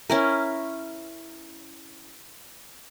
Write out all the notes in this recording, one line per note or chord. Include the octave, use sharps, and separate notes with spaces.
C#4 E4 A#4